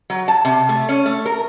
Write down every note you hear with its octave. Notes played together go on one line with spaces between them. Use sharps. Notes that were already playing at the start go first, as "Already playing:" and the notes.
F#3
A5
C3
A3
C#4
A3
A#4